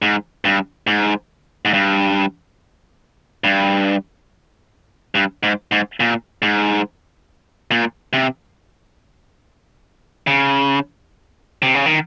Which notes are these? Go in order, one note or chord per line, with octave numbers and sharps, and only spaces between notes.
G#2
G2
G#2
G#2
G2
G2
G2
G#2
G#2
A#2
G#2
A#2
C3
C#3
C3
C#3
D#3